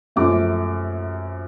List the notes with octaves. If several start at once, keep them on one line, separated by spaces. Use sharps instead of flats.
F#2 F3 A3 D6